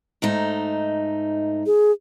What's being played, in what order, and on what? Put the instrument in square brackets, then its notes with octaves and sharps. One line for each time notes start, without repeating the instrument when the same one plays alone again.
[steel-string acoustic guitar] G#2 A3 D#4
[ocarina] G#4